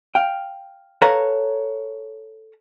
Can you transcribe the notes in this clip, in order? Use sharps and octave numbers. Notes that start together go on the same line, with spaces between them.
F5 G5
A4 B4 C#5 F5 A#5